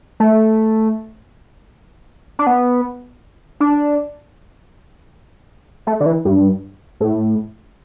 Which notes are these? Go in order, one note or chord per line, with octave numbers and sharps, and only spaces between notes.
A3
D4
B3
D4
A3
D3
E3
G2
A2